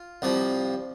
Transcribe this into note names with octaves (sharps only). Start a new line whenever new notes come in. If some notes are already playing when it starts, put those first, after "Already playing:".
Already playing: F4
C2 C3 F3